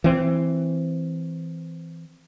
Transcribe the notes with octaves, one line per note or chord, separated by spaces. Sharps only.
E3 C4